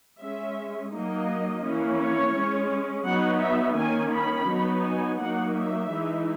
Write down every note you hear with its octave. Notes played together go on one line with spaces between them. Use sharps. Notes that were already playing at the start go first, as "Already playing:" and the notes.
G#3 C#4 E5
F#3 A#3 D#4 D#5
E3 A#3 C#4
C#5
G#3 C#4
F#3 B3 D#4 F#5
E5
D#3 A#3 C#4 G#5
B5
F#3 B3 D#4
G#5
F#3 A#3 D#4 F#5
E5
E3 G#3 D#4